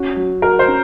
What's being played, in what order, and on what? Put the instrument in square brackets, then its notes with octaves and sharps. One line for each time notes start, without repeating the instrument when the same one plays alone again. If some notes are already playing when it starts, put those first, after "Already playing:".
Already playing: [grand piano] C#4 F#4
F#3
[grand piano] F#4 [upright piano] A#4
[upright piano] C5
[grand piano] C#4